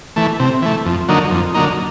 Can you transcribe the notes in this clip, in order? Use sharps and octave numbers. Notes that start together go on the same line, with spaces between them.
E3 A3
C3
E3 A3
F2
D3 F#3 A#3 D#4
F2
D3 F#3 A#3 D#4